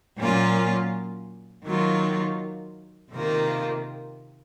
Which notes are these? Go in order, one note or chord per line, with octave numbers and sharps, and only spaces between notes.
A#2 F#3 A#3 C#4 F4
D#3 F#3 A#3 F4
C3 D#3 A#3 F4